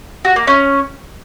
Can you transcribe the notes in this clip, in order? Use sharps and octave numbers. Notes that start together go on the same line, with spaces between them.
F#4
A#3
C#4